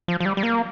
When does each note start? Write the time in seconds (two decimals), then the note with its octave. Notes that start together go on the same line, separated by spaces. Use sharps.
0.08 F3
0.20 F3
0.25 G3
0.37 G3
0.43 A#3